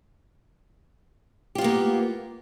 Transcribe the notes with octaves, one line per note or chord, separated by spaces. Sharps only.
A#3 B3 F4 G4